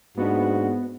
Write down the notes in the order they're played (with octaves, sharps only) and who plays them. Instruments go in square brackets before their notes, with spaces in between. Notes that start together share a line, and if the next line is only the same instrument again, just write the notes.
[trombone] G#2 [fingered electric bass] A#3 D4 [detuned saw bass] B3 [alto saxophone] F#4